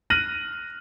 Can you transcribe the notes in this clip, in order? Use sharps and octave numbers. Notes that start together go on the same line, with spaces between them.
F6 F#6 A#6 D#7 F#7